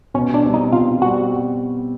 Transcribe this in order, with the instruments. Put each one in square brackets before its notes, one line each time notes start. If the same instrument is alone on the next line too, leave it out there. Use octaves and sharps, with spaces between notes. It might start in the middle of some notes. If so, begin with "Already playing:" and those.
[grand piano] B2 [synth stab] C#4
[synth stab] D4
[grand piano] G3 C4
[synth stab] D#4
[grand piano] B2 [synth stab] F4
[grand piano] G3 C4 [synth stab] F#4